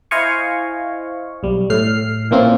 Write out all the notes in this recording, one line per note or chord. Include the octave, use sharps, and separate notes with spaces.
E4 C5 D#5 F5 G#5 C#6
B1 G3
A2 F6 C7
A#2 E3 A#3 C4 C#4 F4